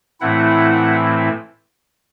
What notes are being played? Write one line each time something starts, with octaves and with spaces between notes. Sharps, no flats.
A2 E3 A3 C4 E4 F#5